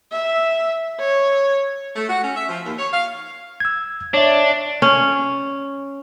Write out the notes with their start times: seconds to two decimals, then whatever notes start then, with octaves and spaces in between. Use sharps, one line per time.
0.13 E5
1.00 C#5
1.96 A3
2.09 F#4
2.23 C#4
2.36 E5
2.49 F3
2.66 D#2
2.79 C#5
2.92 F5
3.60 E6 G#6
4.14 D4 C#5 E5
4.82 C#4